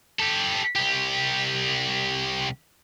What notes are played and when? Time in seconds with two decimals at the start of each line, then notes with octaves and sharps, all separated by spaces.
0.20 G4 A4
0.76 C2 G4